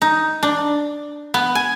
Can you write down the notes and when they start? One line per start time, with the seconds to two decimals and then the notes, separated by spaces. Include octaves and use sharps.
0.02 D#4
0.43 D4
1.34 B3
1.55 G#5